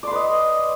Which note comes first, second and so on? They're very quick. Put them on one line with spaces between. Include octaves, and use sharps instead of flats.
D5 C6 B4 D#5